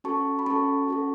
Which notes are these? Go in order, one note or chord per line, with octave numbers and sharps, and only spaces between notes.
C#4 F#4 A4 A5 C#6
B5
C#4 F#4 A4 A5 C#6
C#4 F#4 A4